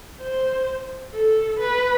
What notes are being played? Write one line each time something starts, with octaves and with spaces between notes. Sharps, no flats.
C5
A4
B4